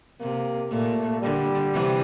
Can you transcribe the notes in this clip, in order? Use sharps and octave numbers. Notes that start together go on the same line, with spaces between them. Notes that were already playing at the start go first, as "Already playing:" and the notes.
C3 A#3
A#2 A3
D3 G3
C3 E3